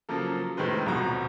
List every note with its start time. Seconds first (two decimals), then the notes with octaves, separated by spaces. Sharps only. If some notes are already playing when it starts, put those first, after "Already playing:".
0.09 C#3 F3 F#3 A#3 A4
0.57 F1 A2 D#3 G#3 B4 C5
0.86 D#1 C2 B2 F3 F#4 A#5